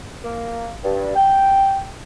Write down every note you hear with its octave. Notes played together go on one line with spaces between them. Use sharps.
A#3
G2
G5